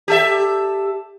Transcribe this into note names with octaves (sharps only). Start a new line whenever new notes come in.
G4 A4 E5